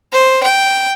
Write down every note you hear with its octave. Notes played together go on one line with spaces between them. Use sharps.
C5
G5